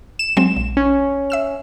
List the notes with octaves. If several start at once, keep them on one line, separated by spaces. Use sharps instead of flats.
E7
F#3 G#3 C4
A#1
C#4
E5 E6 E7